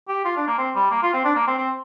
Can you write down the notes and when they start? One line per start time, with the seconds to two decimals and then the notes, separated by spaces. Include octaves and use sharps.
0.08 G4
0.25 F4
0.37 D4
0.47 A#3
0.58 C4
0.75 G3
0.91 A#3
1.03 F4
1.13 C4
1.25 D4
1.36 A#3
1.47 C4
1.58 C4